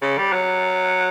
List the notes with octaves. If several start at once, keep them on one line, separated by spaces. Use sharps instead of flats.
C#3
G3
F#3